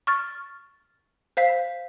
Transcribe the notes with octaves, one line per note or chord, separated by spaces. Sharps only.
C#6 F6 A6
C5 F5 B6